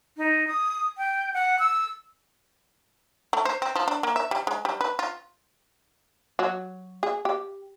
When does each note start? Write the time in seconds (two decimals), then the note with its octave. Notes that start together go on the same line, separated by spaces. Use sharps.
0.17 D#4
0.48 D#6
0.98 G5
1.34 F#5
1.59 E6
3.33 A3
3.45 C5
3.62 C4
3.76 F3
3.88 D4
4.03 A#3
4.16 E5
4.31 G3
4.47 G#3
4.65 G3
4.81 B4
4.99 F4
6.39 F#3
7.03 G#4
7.25 G4